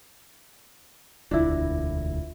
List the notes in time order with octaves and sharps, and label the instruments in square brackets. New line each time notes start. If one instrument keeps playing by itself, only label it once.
[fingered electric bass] E1 D2 [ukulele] D4 E4 [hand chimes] F4 E5